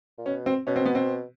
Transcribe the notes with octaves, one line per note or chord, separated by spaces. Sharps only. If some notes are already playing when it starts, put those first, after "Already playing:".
A#2
B2 C#4
C4
B2 C#4
C4
B3
C4